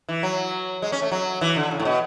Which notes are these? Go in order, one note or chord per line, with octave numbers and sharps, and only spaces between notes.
E3
F#3
G#3
C#4
A3
F#3
E3
D3
C#3
A2
B2